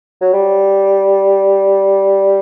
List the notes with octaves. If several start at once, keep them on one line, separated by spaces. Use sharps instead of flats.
F#3
G3